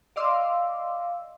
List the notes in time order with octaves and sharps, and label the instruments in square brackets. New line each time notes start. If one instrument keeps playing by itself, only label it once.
[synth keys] D5 D#5 F5 C6 D6 E6